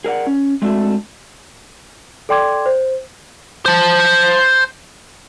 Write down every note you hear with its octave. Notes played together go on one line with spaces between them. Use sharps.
G#4 A#4 D5 F#5
C#4
G#3 A3 C4 D4 F#4 E5
A4 D5 G5 C6 D6 G#6
C5
C5 A5